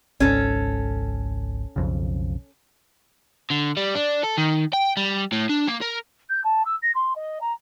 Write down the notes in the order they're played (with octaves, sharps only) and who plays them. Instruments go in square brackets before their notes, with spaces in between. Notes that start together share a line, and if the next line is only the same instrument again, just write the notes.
[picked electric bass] G#1 C#2 G#2 [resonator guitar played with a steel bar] C#4 A4
[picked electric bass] B1 F2 C#3
[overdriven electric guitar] D3
G3
D4
A4
D#3
G5
G3
A2
D4
A#3
A#4
[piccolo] G6
A5
E6
A#6
C6
D#5
A#5